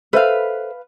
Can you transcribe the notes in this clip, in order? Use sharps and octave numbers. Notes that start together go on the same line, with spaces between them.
A4 B4 C5 E5 F5